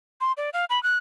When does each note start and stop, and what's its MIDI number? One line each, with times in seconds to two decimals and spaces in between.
0.21 0.32 84
0.37 0.50 74
0.53 0.65 77
0.70 0.82 83
0.83 0.98 90